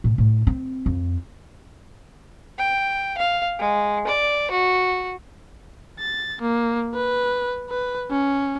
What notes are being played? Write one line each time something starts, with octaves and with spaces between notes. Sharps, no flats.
A2
A2
C4
F2
G5
F5
G#3
D5
F#4
A6
A#3
B4
B4
C#4